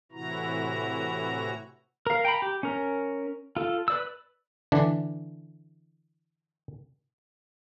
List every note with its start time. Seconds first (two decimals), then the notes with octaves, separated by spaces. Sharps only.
0.12 A2 C3 E3 E4 F#4 A#5
2.07 A#4 F5
2.25 G5 A#5 B5
2.42 G4
2.63 C#4 A#4
3.57 F4 A4
3.88 B4 D5 E6
4.72 D3 E3 D4